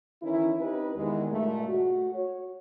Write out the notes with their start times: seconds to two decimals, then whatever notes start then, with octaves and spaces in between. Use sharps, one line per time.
0.22 D#3 E3 C#4 D#4 E4
0.59 C4 D#4 G4 B4
0.95 E2 D#3 G#3
1.30 G2 A#2 G#3 A3
1.68 F#4
2.14 C#5